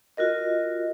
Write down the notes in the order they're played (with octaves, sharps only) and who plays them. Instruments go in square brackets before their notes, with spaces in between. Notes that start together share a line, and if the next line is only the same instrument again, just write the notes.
[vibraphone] F4 F#4 A#4 D#5